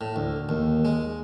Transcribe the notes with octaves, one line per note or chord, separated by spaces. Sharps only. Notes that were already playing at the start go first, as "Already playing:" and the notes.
A2
D2
D#2
G#3